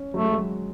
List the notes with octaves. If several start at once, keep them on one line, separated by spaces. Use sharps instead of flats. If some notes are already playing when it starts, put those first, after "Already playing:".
Already playing: C#4
F#3 A3
G#3
F#3